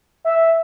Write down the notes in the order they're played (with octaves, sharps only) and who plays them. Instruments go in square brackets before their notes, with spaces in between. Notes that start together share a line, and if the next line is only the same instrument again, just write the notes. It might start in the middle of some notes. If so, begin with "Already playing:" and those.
[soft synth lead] E5